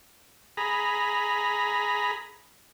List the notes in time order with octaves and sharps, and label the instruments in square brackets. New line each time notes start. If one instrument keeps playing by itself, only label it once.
[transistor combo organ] G#4 A#5 B5